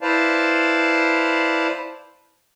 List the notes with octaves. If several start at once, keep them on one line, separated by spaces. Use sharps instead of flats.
E4 B4 C5 D5 F5 A5